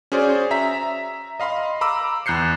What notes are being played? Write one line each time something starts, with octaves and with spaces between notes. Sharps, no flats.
C#4 F#4 G#4 C5 D5
E5 A#5 B6
D#5 F5 B5 C6
A#5 B5 D6 E6
E2 F#6 G6 C7 C#7